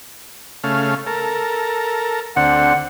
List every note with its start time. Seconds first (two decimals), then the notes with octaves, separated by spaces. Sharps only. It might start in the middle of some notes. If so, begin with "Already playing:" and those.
0.64 C#3 A3 F5
1.07 A4 A#4
2.36 D2 D3 C4 F#5